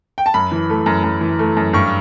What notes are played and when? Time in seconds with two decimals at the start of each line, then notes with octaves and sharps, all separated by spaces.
0.18 G5
0.26 A5
0.34 F#2 B5
0.51 E3
0.70 A3
0.86 F#2
1.04 F#2
1.21 E3
1.39 A3
1.57 F#2
1.73 G2 C#6